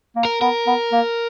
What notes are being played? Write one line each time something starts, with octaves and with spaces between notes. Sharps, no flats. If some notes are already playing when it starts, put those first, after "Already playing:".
A#3
A#4
B3 A#4
B3
A#3